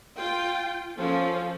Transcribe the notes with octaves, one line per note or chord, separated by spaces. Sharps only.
F4 G5
F3 C#4 A4